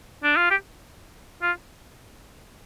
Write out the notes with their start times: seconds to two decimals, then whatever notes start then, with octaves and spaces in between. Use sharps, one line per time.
0.24 D4
0.36 F4
0.50 G4
1.42 F4